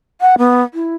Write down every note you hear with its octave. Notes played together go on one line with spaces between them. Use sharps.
F#5
B3
E4